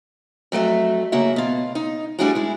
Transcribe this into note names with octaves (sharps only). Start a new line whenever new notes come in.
F2 F#3 A3 E5
C#3 A#3 F#4 E5
B2 F4
D#4
G3 A3 D4 E4 F#4 G#4
G#3 E4